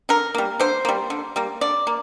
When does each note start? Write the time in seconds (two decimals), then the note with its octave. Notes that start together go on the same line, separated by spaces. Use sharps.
0.09 D3 A#4
0.35 G3 A#3
0.60 D3 C5
0.85 G3 A#3
1.10 D3
1.36 G3 A#3
1.61 D3 D5
1.87 A#3